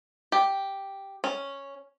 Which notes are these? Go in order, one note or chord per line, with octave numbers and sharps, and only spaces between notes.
G4
C#4